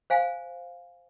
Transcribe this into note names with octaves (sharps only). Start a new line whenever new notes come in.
C5 F5 G#5